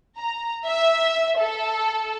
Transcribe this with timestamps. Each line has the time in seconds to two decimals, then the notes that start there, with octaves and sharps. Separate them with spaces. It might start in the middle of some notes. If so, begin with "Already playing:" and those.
0.17 A#5
0.65 E5
1.38 A4